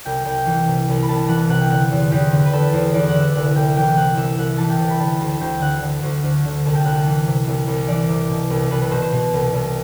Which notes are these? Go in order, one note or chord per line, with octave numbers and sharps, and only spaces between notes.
C2 G5
C2 G5
E3
C3
C2
B5
C2 A5
E3 F#5
C3 F#5
G5
D3 F#5
E2
E2 G4
D3
B4
D3 A4
E2 C5
E2 D5
F#5
D3 E5
C2 F#5
C2 G5
E3 G5
C3 F#5
C2 E5
C2 F#5
E3 A5
G5
C3
B5
D3 A5
D2 A5
D2 G5
D3 F#5
D3
D2
D2
D3
C2 A5
G5
C2 F#5
F#5
E3
C3
C2
C2
E3 D5
C3
B2
C2
C2 B4
B4
B2 C5
C5
B2
C2
C2